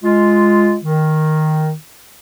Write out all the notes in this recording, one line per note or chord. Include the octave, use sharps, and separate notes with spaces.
G#3 F4
D#3